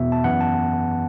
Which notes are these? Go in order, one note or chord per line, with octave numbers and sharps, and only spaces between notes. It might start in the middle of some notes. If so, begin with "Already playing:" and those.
Already playing: E2 B2 B3 E5
A5
F#2 E3 B3 F#5
A5